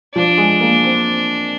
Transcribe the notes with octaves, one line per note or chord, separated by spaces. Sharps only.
F3 D4
G#3
A#3
C4